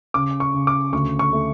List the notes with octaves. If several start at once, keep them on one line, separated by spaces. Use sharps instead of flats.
C#3 D6
C#6
C#3
D6
D2 C#6
C#6
A3